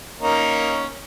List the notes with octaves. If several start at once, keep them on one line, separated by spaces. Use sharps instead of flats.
A#3 C#4 D#4